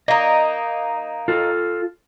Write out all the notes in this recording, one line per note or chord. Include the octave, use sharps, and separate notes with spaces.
A#3 D#4 D#5
F4 A4